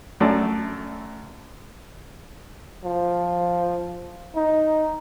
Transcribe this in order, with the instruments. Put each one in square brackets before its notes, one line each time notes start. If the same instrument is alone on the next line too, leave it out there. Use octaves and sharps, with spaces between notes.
[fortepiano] F#2 A3 D5
[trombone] F3
D#4